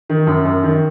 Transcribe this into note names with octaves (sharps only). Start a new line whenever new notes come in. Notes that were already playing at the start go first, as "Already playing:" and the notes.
D#3
F#2
F#2
D#3